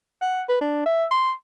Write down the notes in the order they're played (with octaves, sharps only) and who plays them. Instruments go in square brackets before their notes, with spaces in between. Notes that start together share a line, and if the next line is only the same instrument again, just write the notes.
[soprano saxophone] F#5
B4
D4
E5
C6